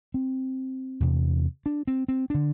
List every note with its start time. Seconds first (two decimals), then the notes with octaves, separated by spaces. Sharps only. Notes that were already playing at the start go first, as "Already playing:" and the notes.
0.14 C4
1.00 E2 C3
1.66 D4
1.87 C4
2.08 C4
2.30 D3 D4